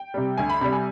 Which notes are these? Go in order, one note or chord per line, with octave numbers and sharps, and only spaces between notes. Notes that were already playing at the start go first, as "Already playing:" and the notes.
Already playing: G5
C3 G3
D2 G#5
B5
C3 G3 B5
G#5